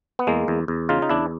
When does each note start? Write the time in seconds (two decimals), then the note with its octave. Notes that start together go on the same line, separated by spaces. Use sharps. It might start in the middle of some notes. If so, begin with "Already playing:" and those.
0.19 B3
0.27 E2 G#3 A#3
0.48 E2
0.68 E2
0.89 C#3 D#4 F4
1.02 D#4
1.09 E2 D4 E4